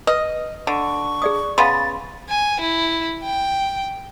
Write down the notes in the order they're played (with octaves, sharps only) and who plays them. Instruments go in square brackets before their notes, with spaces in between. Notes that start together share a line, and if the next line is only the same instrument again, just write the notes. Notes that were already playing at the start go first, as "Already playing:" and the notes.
[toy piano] B4 [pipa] D#5
[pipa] D3 [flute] C#6
[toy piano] G#4 D5 D#6
[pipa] C#3 B3 [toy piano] F5 C6 [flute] A6
[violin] G#5
E4
G5